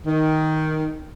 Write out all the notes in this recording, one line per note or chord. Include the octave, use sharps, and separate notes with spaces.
D#3